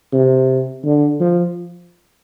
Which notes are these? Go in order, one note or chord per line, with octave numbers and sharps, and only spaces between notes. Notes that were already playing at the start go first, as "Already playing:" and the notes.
C3
D3
F3